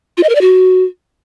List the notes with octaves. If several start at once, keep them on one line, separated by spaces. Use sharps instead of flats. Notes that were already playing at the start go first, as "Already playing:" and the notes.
F4
D#5
A#4
D5
F#4